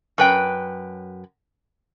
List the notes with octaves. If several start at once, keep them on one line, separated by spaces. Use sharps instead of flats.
F#2 B4 G5